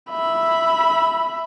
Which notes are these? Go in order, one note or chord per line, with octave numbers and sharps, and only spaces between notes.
E5 B5